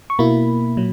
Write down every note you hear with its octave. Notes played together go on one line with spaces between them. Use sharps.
C#6
B2 A#3 E4 B5
A#2 F#3